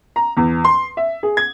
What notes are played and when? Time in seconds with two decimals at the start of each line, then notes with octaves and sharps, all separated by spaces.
0.16 A#5
0.37 E2
0.65 C6
0.97 E5
1.23 G#4
1.37 G#6